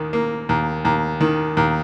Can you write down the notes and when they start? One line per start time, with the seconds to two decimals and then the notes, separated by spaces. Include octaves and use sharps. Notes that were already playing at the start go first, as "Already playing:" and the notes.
Already playing: D#2 D#3
0.13 A#3
0.49 D#2
0.85 D#2
1.21 D#3
1.57 D#2